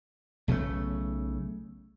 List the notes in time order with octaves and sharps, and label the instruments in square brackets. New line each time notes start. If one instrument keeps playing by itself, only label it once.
[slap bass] B1 C#3 E3 A3